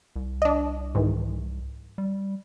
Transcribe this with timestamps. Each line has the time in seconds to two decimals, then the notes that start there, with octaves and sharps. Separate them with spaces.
0.16 C2
0.42 D4 D#5
0.95 G#2 D#3 E3
1.98 G3